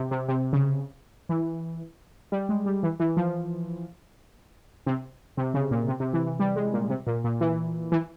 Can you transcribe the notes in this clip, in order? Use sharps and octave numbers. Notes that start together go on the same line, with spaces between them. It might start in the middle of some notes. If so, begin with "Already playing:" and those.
Already playing: C3
C3
C3
C#3
E3
G3
G#3
G3
E3
E3
F3
C3
C3
C#3
A#2
C3
C3
E3
E3
G3
G#3
A#2
C3
A#2
A#2
E3
E3